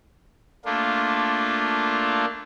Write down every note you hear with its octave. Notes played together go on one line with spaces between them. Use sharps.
A3 A#3 D4 F4